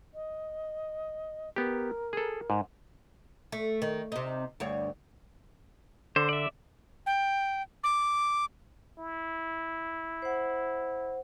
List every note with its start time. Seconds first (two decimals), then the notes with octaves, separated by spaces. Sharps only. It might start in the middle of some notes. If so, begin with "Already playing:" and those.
0.14 D#5
1.56 B3 G4 A#4
2.13 G#4 A4
2.50 G#2
3.52 A3
3.82 D#3
4.12 C3 D#4
4.60 D2 G2 C#5
6.16 D3 C5
6.29 D5 E5
7.06 G5
7.84 D6
8.98 E4
10.22 C5 F#5